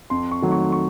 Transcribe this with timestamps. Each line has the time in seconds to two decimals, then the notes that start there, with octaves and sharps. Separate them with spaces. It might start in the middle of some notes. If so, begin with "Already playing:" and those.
0.10 F2 C6
0.31 C#6
0.42 D#3 F#3 A3
0.52 C#6
0.72 C#6